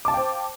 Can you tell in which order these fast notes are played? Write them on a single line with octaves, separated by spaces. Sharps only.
D6 A5 F5 G5 C5